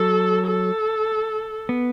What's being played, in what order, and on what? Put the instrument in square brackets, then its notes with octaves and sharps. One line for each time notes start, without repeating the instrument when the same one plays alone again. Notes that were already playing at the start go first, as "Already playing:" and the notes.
Already playing: [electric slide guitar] F#3 [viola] A4
[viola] A4
[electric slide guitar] B3